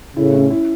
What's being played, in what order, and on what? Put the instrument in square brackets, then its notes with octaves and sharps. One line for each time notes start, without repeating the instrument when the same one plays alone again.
[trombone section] A2 C#3 [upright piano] E4
[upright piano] C#4
E4